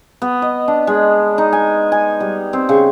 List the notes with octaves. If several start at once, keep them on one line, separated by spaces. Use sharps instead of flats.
B3
D#5
D4
G#3
D#4
G#5
G#5
G3
C4
C#3